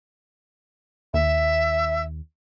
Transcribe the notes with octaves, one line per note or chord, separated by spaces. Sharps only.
D#2 E5